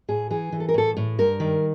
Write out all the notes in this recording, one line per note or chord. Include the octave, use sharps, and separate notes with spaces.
A2 G#4
E3 G#4
E3
A4
A#4
A2 A4
A2
G2 A#4
D#3